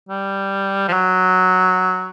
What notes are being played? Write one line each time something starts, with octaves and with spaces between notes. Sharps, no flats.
G3
F3
F#3